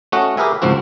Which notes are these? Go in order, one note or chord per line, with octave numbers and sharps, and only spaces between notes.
A3 C#4 F#4 D#5 F#5
G4 G#4 A#4 B4 E5 G#5
C#2 G#2 F3 C4 F#4